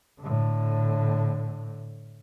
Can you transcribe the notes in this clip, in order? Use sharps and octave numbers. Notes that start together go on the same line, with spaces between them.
A2 D3